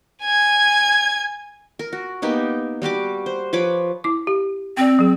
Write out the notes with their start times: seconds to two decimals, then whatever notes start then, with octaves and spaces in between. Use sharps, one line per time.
0.24 G#5 G#6
1.79 A#4
1.93 F#4
2.22 A#3 B3 D#4 G4
2.82 G3 F#4 G4 D6
3.26 C5
3.53 F3 B4 C#5 D6
4.04 E4 D6
4.27 G4
4.77 C4 D5 G5
4.99 F#3 G#4